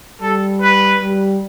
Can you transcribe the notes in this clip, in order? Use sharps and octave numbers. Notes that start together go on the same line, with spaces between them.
G3 A4
B4
G3